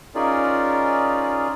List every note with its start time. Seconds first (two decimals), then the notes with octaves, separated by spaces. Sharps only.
0.15 C#4 D#4 F4 G#4 A#4 D5